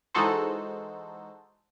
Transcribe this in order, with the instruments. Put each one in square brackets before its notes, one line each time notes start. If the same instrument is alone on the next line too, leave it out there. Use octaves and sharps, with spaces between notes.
[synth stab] E3 G#3 D#4 F#4 A4 C5